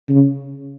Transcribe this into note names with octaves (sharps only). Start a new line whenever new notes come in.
C#3